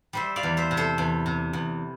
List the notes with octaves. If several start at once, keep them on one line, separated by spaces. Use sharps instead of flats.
G3 C5 E5
D5 F5
E2
C5 E5
C3
A4 C5
E2
C3
E2